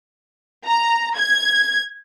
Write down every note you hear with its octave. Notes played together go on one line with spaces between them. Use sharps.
A#5
G#6